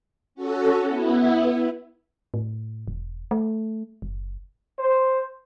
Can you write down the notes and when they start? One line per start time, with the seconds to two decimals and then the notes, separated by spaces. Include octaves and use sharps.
0.35 C#4 F#4 A4
0.86 B3 E4
2.34 A2
2.88 E1
3.31 A3
4.02 F#1
4.79 C5